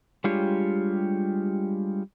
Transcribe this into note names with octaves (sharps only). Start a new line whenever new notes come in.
G3 G#3 D4 F4 G4 C#5